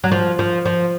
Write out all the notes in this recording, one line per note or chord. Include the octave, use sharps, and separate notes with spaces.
F#3
F3
F3
F3